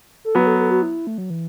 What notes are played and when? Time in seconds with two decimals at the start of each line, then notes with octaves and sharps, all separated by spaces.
0.25 A4
0.35 F#3 B3 B4
0.47 A4
0.59 A4
0.71 F#4
0.82 E4
1.07 A3
1.18 F#3
1.30 E3